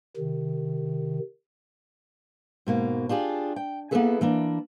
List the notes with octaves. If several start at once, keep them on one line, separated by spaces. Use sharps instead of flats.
C3 D#3
G#2 B2 A#3
D4 F4 G4 G#4
G5
A#3 B3 E4 G#4 A4 B4
E3 A#3 D4